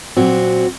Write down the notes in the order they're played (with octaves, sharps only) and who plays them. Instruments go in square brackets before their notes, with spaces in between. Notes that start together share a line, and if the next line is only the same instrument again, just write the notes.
[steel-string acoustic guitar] A#2 F#3 C4 F#4